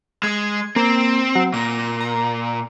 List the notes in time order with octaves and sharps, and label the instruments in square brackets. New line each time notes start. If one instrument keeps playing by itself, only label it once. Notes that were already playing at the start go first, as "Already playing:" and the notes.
[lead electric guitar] G#3 [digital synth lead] G#6
[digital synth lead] A#3 [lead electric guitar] C4
[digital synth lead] F#3
[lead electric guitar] A#2 [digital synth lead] A#6
[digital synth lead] A#5